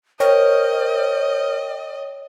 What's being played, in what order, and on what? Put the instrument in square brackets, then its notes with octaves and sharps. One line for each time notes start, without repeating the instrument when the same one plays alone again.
[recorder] A#4 [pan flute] C5 [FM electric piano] C#5 G5 [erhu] D#5